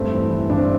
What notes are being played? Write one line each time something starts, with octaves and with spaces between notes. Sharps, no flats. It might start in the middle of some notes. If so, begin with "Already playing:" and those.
Already playing: G2 A3 C4
E3
E3
G2 D4
C4